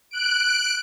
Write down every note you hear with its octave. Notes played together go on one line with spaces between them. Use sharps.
F#6 D7